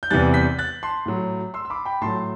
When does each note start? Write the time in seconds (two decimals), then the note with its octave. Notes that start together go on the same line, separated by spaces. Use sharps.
0.03 G6
0.11 E2 C3 E3 G3 F#6 A6
0.34 G6 B6
0.59 F#6 A6
0.83 A5 C6
1.06 A2 F#3
1.54 C6 E6
1.65 E6
1.70 B5 D6
1.85 G5 B5
2.01 A2 F#3 A5 C6